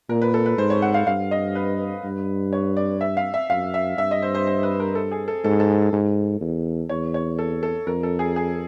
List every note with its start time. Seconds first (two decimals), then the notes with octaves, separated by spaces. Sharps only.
0.09 A#2 A#4
0.22 B4
0.34 A4
0.46 B4
0.58 G#2 C5
0.70 C#5
0.82 F#5
0.94 F5
1.07 G2 F5
1.31 D#5
1.55 B4
2.04 G2
2.53 C#5
2.77 D5
3.01 E5
3.17 F5
3.34 E5
3.50 F#2 F5
3.74 E5
3.98 G2 E5
4.11 D#5
4.22 C5
4.35 C5
4.47 C5
4.63 B4
4.80 A#4
4.95 A4
5.11 G#4
5.28 A4
5.44 G#2 A4
5.60 A4
5.93 G#2
6.41 E2
6.89 E2 C#5
7.14 C#5
7.39 A4
7.63 A4
7.87 F2 A#4
8.03 A4
8.19 G#4
8.36 G#4